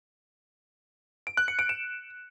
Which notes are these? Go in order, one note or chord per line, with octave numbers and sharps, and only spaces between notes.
D7
F#6
C#7
D7
E7